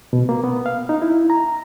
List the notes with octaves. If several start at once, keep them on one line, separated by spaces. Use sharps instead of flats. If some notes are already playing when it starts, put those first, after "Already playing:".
B2
A#3
B3
F5
D#4
E4
A#5